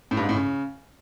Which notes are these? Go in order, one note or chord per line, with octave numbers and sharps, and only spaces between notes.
A2
G2
G#2
A2
C#3